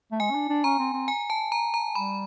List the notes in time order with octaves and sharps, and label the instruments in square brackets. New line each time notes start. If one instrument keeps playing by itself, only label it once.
[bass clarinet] A3
[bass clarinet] G#3 [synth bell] G#5
[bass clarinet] C#4
D4
D4
[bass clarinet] C#4 [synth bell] A#5
[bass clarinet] C4
C4
[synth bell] G#5
A5
A#5
A#5
[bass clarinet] G3 [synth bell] B5